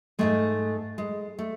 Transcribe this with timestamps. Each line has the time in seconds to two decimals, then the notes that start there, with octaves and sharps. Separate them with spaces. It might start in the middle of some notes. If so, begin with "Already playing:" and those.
0.19 G#2 E3 G#3 A3
0.98 G#3
1.39 A3